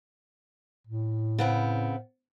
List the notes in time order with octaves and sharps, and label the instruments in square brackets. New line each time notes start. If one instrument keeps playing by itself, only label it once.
[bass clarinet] A2
[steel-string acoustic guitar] C#3 B3 C4